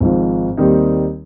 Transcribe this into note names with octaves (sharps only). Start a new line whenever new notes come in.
G#1 G#2 F3
D#2 D#3 G3 C4 D#4